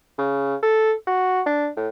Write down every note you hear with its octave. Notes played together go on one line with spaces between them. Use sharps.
C#3
A4
F#4
D4
A2